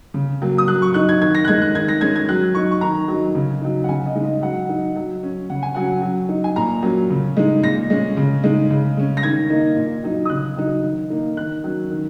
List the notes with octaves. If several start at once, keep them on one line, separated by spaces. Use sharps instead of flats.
C#3
F#3 A#3
D#6
F#3 F#6
C#6
D#4 F#6
G#6
D#3 G#6
A#6
F#6
G#3 D#4 G#6
F#6
D#3 G#6
A#6
G#3 C#4 G#6
G#6
F#3 F#6
D#4 C#6
C#6
D#3 A#5
F#3 D#4
C#3
F#3 D#4
F#5
C#3 G#5
D#5
G#3 D#4
D#5
F#3 F#5
D#4
F#3
C#4
C#3 F#5
G#5
F#3 C#4 F#5
F#3
D#4
G#5
A#2 A#5
F#3 A#3 C#4
C#3
G#3 D#4
A#2 A#6
G#3 C#4
C#3
G#3 D#4
C#3
G#3 C#4
A#6
D#3 G#6
A#3 D#4
A#2
F#3 D#4
D#6
C#3 F#6
F#3 D#4
D#3
A#3 D#4
D#3 F#6
F#3 C#4
D#3